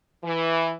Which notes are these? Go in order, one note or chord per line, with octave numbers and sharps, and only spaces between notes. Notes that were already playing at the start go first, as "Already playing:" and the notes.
E3